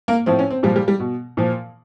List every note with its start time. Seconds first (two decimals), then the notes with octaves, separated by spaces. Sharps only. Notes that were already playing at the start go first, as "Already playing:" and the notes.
0.08 A#3
0.26 A2 F3 C4
0.39 C#4
0.50 C4
0.63 A#2 F3 G3
0.76 G3
0.88 G3
1.00 B2
1.37 A#2 F3